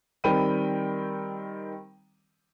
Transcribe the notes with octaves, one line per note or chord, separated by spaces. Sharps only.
D#3 G3 C4 G5 B5 D#7